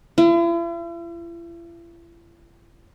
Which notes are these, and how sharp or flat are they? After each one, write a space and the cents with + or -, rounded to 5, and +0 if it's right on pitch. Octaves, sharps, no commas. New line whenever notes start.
E4 +45